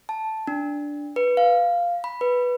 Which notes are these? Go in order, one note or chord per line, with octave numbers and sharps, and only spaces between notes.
A5
D4
B4
F5
B5
B4